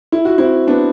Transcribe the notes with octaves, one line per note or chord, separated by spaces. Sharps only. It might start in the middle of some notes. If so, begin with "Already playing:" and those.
E4
F#4
C4 E4
B3 D4